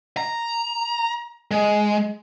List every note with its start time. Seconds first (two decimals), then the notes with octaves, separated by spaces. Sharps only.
0.17 A#5
1.51 G#3